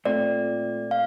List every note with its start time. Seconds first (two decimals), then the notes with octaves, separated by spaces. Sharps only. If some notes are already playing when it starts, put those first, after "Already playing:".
0.05 A#2 A3 C4 F4 D5
0.91 F5